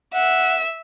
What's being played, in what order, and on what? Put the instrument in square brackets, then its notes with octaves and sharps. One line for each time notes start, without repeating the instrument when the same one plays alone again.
[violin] E5 [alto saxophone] F#5